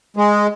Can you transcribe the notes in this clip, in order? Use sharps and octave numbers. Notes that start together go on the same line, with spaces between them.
G#3